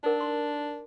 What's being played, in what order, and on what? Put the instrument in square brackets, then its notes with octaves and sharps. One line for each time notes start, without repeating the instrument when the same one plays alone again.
[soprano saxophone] D4 [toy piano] D#4 A#4
[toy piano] C6